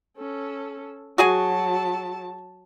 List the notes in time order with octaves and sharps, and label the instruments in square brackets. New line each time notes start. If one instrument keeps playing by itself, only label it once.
[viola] C#4 A4
[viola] F#3 A5 [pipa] F#4 G#4 G#5